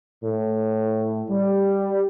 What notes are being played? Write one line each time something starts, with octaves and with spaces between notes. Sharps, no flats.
A2
G3